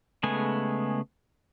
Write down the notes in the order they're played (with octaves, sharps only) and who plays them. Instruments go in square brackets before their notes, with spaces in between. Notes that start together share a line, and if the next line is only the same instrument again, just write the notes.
[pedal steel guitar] C#3 G#3 A3 B3 G#5